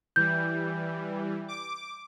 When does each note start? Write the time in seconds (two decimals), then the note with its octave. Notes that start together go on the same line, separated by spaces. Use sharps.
0.16 E3 G3 G6
1.48 D6